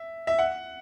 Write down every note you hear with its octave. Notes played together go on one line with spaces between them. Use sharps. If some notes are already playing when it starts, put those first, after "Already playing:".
Already playing: E5
E5
F#5